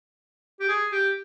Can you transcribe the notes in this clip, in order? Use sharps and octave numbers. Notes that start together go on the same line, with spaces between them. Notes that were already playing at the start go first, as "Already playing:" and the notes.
G4
G#4
G4